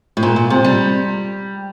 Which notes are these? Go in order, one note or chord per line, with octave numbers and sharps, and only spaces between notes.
A2
A#2
A#2
C3
G3